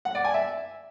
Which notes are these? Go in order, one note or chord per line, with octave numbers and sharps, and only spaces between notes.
F#5
D5
G#5
E5